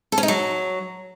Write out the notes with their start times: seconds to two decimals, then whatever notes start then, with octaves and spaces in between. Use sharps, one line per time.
0.12 A4
0.18 C#4
0.23 D#4
0.28 F#3